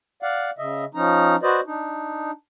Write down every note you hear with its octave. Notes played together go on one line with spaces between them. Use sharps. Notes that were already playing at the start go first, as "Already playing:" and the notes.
D5 F5 F#5
C#3 D#5 E5
F3 C#4 D#4 A#5
F#4 B4 C5 D5 D#5
D4 D#4